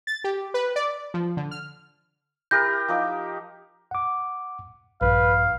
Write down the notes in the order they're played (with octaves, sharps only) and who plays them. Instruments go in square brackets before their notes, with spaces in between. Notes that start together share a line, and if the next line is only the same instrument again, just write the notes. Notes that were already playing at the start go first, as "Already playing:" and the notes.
[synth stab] A6
G4
B4
D5
F3
D3
F6
[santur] E4 G4 A#4 [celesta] G6 A#6
[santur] F3 D#4 D6
[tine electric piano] F#5 D6
[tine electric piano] A#1 G2 [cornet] B4 [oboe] F5